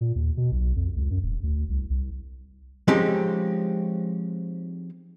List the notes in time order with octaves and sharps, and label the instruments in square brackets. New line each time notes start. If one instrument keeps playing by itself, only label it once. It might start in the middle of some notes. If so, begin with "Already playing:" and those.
[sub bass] A#2
D#2
B2
B1
F2
C#2
F#2
D#1
D2
C2
C2
[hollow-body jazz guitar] F3 G#3 C4 C#4 D#4 G4